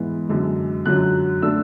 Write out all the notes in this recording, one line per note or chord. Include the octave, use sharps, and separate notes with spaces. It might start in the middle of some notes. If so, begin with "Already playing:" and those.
Already playing: G#2 E3 B3
F#2 D3 G#3
F#2 D3 F#3 F#6
D3 A3 D4 E6